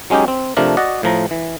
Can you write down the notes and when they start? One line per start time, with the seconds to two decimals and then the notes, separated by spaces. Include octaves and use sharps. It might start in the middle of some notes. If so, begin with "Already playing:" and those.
0.10 F#3 G#3 C#4 D#4 G4
0.28 C4
0.57 C3 F3 A3 D4 A#4
0.77 F#4 D5 D#5 F#5
1.03 A2 F3 A#5
1.31 E3